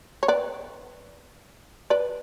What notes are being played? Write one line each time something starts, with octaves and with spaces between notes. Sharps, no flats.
C#5
B4 D5
B4 D5